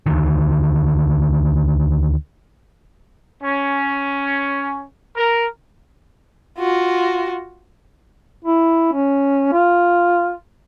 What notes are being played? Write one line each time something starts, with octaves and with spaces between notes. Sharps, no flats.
D2 D3 D#3
C#4
A#4
F4 F#4
E4
C#4
F4